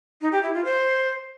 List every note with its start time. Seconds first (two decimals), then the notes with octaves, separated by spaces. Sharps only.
0.21 D#4
0.32 G4
0.43 E4
0.54 F4
0.65 C5